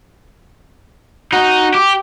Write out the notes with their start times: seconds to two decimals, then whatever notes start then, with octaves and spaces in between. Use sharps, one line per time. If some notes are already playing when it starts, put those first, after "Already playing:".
1.33 D#4 F#4
1.75 G4